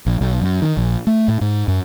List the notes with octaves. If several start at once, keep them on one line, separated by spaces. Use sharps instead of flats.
A#1
B1
F#2
D#3
A#1
A3
A2
G#2
F#2